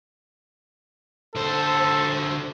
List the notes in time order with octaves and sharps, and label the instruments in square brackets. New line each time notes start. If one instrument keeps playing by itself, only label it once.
[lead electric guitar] D3 C5 [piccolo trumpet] A4